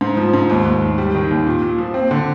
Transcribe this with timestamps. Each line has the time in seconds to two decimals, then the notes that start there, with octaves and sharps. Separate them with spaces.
0.01 G#2
0.17 F3
0.33 G#2
0.50 D#2
0.65 D#2
0.82 D#2
0.98 G3
1.15 D#3
1.31 D#2
1.47 A#2
1.62 A#2
1.78 F3
1.94 C4
2.11 D3